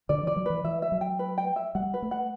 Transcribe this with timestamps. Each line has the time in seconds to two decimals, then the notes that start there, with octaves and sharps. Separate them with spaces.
0.09 D3 D5
0.23 E3 D5
0.36 F#3
0.46 E3 B4
0.64 E3 E5
0.82 E5
0.92 F#3
1.01 G5
1.19 B4
1.38 G5
1.56 E5
1.75 G3 F#5
1.94 B4
2.02 A3
2.11 F#5